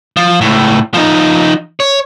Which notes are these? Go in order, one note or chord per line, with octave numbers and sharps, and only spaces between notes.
F3
C#2 A2
F3 D#4
C#5